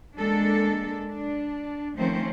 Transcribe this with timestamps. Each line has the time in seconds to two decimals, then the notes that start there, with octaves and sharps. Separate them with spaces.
0.17 G#3 A#3 D4 A4
1.09 D4
1.98 D#3 F3 A3 C4 C#4 C5